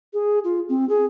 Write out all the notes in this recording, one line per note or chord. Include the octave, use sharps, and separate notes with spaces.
G#4
F4
C4
G#4